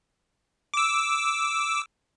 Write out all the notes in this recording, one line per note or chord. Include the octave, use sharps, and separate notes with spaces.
D6 E6